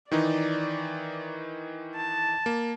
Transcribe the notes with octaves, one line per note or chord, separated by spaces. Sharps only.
D#3 E3 D#4 D5
A5
A#3